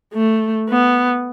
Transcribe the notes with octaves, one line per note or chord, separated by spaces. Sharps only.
A3
B3